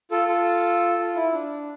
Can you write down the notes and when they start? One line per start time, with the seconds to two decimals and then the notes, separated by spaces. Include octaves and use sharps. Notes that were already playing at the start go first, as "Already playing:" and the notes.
0.11 F4 A4
0.28 F4 A4
0.99 F4
1.16 E4
1.33 D4